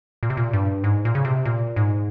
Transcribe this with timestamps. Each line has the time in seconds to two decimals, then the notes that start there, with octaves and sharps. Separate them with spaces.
0.23 A#2
0.30 C3
0.37 A#2
0.53 G2
0.84 G#2
1.05 A#2
1.15 C#3
1.25 C3
1.45 A#2
1.76 G#2